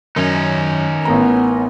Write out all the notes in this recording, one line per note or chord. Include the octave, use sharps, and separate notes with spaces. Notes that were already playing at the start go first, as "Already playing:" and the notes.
F#2 D#3 C#4 D#4
A1 B3 A#4 A#5